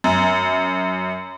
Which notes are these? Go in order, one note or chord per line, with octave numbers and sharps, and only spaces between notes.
F#2